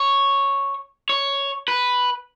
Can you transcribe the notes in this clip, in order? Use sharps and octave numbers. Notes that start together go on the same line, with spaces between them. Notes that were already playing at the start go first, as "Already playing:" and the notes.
Already playing: C#5
C#5
B4